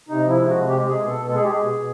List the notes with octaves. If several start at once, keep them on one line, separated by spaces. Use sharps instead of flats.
C3 D#4
F3
E4
G#3
F#4
C3
G#3 G4
G#3 G#4
B2
A4
B2
G#3 A4
G#4
G#3 G4
G#4
B2
B2